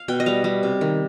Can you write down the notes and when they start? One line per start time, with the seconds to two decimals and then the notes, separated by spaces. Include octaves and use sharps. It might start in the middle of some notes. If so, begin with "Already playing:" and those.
Already playing: F5
0.08 B2 G5
0.20 D#5
0.26 G3 F5
0.44 G3
0.63 C3
0.81 D#3